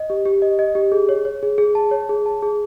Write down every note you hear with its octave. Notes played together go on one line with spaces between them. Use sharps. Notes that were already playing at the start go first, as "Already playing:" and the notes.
Already playing: D#5
G4
G4
D#5
D#5
G4
G#4
C#5
C#5
G#4
G#4
A5
C#5
G#4
A5
G#4